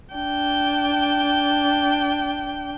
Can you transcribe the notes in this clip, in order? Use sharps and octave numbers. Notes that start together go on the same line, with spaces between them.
D4 G5